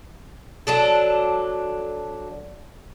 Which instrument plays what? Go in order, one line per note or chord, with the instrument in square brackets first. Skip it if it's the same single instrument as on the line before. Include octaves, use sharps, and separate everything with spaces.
[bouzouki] F#3 D4 A4